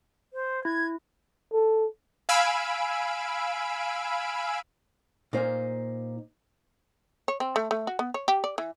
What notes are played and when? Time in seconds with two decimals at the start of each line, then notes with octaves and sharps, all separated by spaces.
0.33 C5
0.65 E4 G#6
1.53 A4
2.29 F5 G#5 B5 E6 D7
5.33 A#2 A#3 D#4 C5 G#5
7.28 C#5
7.40 C4
7.56 A3
7.71 A3
7.87 F#4
7.99 B3
8.14 C#5
8.28 G4
8.44 D5
8.58 E3